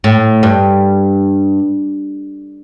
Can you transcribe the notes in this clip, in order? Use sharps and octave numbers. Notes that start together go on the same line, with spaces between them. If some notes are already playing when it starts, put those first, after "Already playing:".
A2
G2